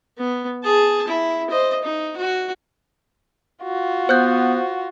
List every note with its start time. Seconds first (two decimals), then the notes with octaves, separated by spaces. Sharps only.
0.17 B3
0.63 G#4 A5
1.07 E4
1.50 C5 D#5
1.83 D#4
2.16 F#4
3.64 F4 F#4
4.09 B3 C5 F#6 G6